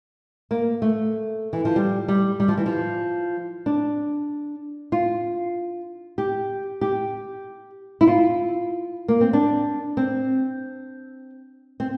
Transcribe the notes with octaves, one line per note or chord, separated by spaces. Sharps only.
A#3
A3
E3
F3
G3
G3
G3
F3
E3
F3
D4
F4
G4
G4
E4
F4
A#3
C4
D4
C4
C4